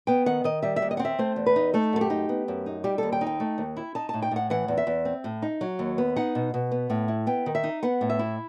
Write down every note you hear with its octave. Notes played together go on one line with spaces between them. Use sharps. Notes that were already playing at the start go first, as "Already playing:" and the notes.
B3 G5
D#3 F#5
D#3 D#5
G3 E5
E5
D#2
D#5
C4 F#5
E5
A3 C5
E2
B4
D#4
A3 A4
F#2 A4
G4
D#4
B3
F#2
D#4
G3 G4
D#2 A4
G5
D#4
G5
A3
D#2
E4
D#4 A5
A2 A5
G5
A2 F#5
E3 F#5
E2
E5
E2
C4
A2
D#4
F#3
D#2
B3
D#4 F#5
B2
B2
B3
A2
E4
B3 G5
D#3
E5
D#4
B3 F#5
A2
E5
E4